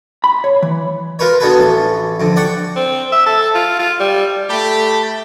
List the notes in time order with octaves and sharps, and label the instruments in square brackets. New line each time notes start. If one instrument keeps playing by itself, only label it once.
[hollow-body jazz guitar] B5
C#5
E3
[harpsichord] F4 A#4 B4 C#5
B3 D4 F#4 G#4 A4 B4
A1 A4
F2 D3
D5 F#5 G5 C#6
[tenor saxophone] C4
E5
A4
F4
F4
G3
[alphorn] A3 [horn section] G4 [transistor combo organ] A5 B5